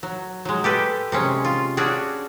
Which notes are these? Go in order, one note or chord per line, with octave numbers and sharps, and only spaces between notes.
F#3
F#3 G#3
G4 A4 B4
C3 G#3 C#4
F4
C#4 D4 F#4 G#4